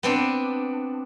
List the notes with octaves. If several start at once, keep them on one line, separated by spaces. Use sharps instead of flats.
B3 C4 D4